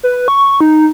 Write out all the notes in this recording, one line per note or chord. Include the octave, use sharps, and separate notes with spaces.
B4
C#6
D#4